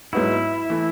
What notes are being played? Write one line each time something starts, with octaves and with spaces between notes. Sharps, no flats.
G#2 F#3 B3 D#4 E4 F#4
E3 A3